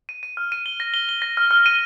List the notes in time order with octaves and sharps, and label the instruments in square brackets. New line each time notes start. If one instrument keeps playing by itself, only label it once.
[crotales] D#7
D#7
F6
D#7
G7
A#6
G7
G7
A#6
F6
F6
D#7